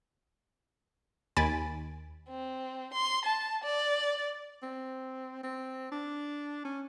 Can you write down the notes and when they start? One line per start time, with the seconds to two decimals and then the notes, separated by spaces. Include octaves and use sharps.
1.37 D#2 G#5 B5 A6 D7
2.29 C4
2.94 C6
3.25 A5
3.64 D5
4.63 C4
5.44 C4
5.92 D4
6.65 C#4